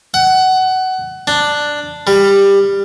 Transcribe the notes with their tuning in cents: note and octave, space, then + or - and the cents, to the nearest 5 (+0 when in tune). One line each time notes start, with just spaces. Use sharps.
F#5 +20
D4 +5
G3 +15